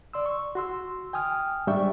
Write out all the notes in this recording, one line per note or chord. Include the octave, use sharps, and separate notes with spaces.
D5 C6 E6
C#6
F#4 C6 E6
G5 G#5 D#6 F6
G#2 G3 D4 E5 G5 C#6